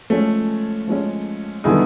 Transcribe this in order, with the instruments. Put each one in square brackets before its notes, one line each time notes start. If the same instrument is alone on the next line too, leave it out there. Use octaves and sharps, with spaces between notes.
[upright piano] F3 G#3 C#4 [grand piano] A3
[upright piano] F3 G#3 C#4
[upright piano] D3 G3 B3 E4 G#4 [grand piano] D#3